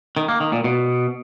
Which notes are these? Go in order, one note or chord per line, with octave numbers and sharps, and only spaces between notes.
D#3
A#3
D#3
A#2
B2